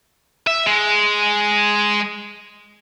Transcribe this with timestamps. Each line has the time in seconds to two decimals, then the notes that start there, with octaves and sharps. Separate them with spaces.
0.47 E5
0.67 G#3